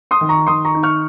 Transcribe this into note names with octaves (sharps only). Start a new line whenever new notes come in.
C6 D#6
D#3
A#5 C#6
D#3 C6 D#6
A#5 C#6
D#4
C#6 F6